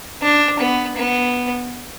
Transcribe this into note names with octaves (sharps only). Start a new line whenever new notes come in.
D4
B3
B3